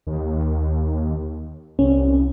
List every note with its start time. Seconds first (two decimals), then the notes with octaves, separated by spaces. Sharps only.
0.07 D#2
1.79 C2 C#4